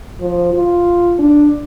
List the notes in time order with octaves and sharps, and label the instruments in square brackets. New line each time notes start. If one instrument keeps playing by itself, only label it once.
[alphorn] F3
F4
D4